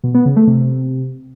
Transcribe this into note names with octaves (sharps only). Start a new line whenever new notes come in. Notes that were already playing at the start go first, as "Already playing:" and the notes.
B2
B3
C#3
A3
C3